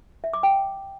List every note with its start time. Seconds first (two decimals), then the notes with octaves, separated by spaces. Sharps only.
0.24 E5
0.33 D6
0.43 G5